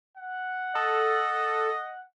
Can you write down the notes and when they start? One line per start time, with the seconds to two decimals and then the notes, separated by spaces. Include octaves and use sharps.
0.18 F#5
0.75 A4 D#5